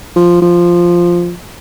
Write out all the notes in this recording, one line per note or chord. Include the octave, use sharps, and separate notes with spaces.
F3
F3